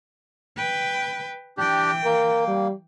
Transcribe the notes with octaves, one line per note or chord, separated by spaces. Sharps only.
B4 G5
E3 D4 G4 G5
A#3 A#4
G3